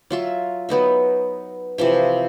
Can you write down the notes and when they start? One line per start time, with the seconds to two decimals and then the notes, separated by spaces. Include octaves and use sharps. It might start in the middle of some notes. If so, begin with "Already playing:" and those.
0.10 F#3 F4 E5
0.69 F#3 B3 D#4 E5
1.78 C3 E3 F3 E5